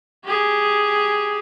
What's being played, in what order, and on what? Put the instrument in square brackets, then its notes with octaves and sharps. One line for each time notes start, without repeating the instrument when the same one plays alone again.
[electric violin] G4 G#4